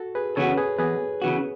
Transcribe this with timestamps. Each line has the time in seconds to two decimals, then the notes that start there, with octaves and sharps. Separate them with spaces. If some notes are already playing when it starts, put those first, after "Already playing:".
Already playing: F#4 A4
0.15 G#4 B4
0.36 C#3 E3 B3 F#4 A4 C#5
0.57 G#4 B4
0.78 E2 G#4 B4
1.22 C#3 E3 B3 F#4